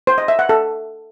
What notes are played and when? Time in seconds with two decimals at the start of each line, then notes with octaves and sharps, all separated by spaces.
0.07 C5
0.18 D#5
0.28 E5
0.39 F#5
0.49 A4